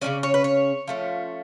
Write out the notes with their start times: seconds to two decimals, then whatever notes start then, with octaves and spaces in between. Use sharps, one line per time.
0.02 C#3 G#3 C#4 D5
0.23 C#5
0.34 B4
0.44 C#5
0.87 F3 A3 C#4